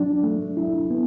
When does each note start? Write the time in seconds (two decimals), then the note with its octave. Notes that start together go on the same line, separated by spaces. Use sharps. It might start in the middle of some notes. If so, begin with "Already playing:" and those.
Already playing: F#3 D4
0.24 A3
0.57 E4
0.90 B3